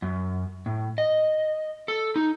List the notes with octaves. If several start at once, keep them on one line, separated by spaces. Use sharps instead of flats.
F#2
A2
D#5
A4
D#4